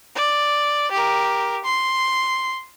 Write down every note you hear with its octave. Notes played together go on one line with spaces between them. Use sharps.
D5
G4 A#4
C6